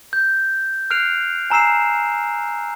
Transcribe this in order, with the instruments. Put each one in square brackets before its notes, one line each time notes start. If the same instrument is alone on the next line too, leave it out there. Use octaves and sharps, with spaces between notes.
[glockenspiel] G6
F6 F#6 C7 D7 F7
G#5 A#5 E6 C7 E7